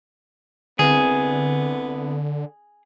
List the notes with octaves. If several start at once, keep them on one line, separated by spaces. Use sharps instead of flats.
C2 D3 B3 G#4